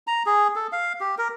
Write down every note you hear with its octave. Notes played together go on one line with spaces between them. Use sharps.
A#5
G#4
A4
F5
G4
A#4